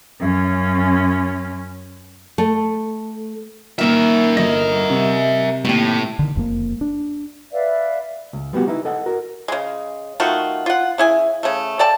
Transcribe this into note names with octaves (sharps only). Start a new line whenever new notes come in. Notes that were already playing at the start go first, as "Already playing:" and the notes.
F#2 C#4
A3
D#3 A#3 E4 A#4 E5
G1 D#5 A#6
C3
D#2 A2 G4
D3 D#3
E1 F2 G#3 A#3
D4
B4 D5 E5 F5
C#2
F3 G3 B3 F#4 G4
D#4 E4 B4
A4 D#5 F#5
F#4 A#4
C#3 G#3
D#3 A3 F4 F#4
F4 F#5
C#3 E4 G#5
C#3 A3
A4 D5 G5 A5